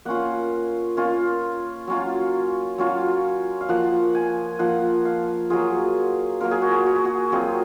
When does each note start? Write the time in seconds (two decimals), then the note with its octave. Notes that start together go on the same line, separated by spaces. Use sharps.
0.05 A#3 C#4 F4 F#5
0.97 A#3 C#4 F4
1.87 F#3 C#4 F4
2.78 F#3 C#4 F4
3.61 F5
3.69 F3 A#3 F4 F#5
4.15 G#5
4.59 F3 A#3 F4 F#5
5.05 F5
5.50 F#3 A#3 F4 G#4
6.41 F#3 A#3 F4 A#4
6.51 G#4
6.62 F#4
6.71 G#4
6.86 F#4
6.96 G#4
7.05 F#4
7.32 F#3 C4 F4 G#4